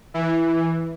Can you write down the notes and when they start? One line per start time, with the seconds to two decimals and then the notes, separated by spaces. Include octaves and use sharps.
0.14 E3